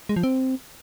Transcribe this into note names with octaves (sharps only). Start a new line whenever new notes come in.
G#3
F3
C4